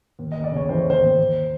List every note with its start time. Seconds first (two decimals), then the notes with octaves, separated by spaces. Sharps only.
0.19 D#2
0.32 D#2 D#5
0.44 D5
0.52 C#3 C#5
0.69 E3 C5
0.80 C#5
0.85 D#2 C5
1.02 D#2
1.18 D#2